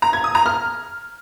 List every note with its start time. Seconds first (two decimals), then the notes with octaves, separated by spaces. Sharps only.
0.02 A#5
0.13 G#6
0.24 D#6
0.35 A#5
0.46 F6